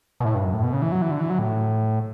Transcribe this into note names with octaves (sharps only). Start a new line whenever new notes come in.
B2
A2
G2
F#2
A2
B2
C#3
E3
F#3
E3
D3
E3
F#3
A2